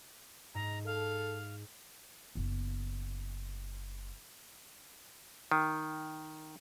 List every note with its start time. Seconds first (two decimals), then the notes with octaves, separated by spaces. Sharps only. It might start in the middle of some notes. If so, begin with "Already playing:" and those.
0.54 G#2 A#5
0.86 A4 F5
2.35 F#1 B3
5.52 D#3